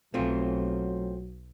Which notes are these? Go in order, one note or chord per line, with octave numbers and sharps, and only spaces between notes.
B1 F#3 A3 C4 F4